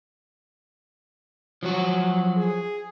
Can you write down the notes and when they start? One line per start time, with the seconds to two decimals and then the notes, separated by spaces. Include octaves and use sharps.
1.63 F3 F#3 C#4 F#4
2.37 G#4